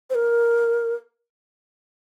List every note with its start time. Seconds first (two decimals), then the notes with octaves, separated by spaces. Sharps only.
0.10 C5
0.15 A#4